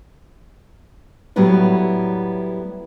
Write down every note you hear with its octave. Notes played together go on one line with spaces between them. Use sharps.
A2 F#3 G3 B3 E4